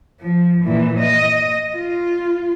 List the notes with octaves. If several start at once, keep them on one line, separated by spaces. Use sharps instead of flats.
F3
A#2 E3
D#5
F4